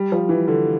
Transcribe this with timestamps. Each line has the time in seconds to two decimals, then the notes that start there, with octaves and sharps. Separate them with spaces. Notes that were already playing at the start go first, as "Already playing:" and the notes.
Already playing: G3
0.12 F3
0.29 E3
0.48 D3